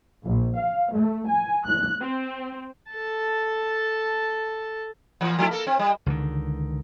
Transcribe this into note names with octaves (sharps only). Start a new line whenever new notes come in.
A#1
F5
A3
G#5
F#6
C4
A4 A5
A#2 E3
F3 A3 E4
A#3 A4
C4
G3
C#2 D3 D#3